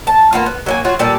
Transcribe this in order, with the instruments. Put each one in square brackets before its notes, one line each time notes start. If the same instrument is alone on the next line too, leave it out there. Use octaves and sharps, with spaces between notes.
[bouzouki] A5
A#3 B3 F4
B3
F#3 A#3 G#5
F#3 F4 F#4
A#2 G3 A4